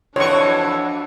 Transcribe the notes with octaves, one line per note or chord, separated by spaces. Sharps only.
F2 E3 D4 F#4 C#5 C#6